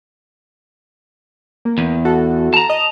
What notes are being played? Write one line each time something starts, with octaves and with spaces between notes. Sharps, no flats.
A#3
E2
F#4 A4
A5 A#5
D#5